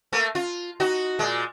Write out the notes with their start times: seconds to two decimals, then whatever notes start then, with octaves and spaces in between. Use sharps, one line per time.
0.13 A3 A#3
0.35 F4
0.80 D#4 F#4
1.19 A#2 G#3